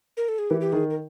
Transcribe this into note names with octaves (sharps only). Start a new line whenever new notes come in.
A#4
A4
G#4
E3 G4
G4
D#3 G#4
A#4